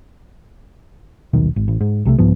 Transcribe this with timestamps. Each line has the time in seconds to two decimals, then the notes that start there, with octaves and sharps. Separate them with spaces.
1.33 D#1 B1 D#3
1.56 G#1
1.68 A1
1.81 G#2
2.05 B1 C3 G#3 A3
2.19 C2 G#2 F3 B3